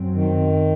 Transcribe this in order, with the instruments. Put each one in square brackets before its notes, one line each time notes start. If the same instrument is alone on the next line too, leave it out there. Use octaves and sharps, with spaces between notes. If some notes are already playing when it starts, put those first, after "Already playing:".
Already playing: [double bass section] F#2 F#3 C4
[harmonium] D#3